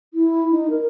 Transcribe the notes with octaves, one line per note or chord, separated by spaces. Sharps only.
E4
D#4
A#4